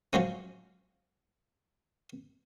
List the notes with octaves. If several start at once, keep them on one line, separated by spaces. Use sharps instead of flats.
F3 F#3 G#3 C#4